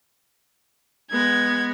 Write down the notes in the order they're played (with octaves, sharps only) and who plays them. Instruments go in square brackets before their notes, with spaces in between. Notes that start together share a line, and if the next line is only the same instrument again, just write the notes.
[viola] G#3 B3 [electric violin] G#6